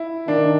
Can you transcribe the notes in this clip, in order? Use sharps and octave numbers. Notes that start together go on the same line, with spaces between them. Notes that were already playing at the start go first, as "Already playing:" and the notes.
Already playing: E4
D#3 D4